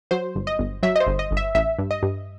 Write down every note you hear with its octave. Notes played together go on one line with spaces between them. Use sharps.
F#3 C5
G1
D#5
G1
F#3 E5
D#5
C5
G1
D#5
G1
E5
A1 E5
G2
D#5
G2